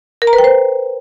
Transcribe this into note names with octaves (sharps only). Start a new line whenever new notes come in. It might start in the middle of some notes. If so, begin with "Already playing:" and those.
A#4
A#5
B4
G5
C5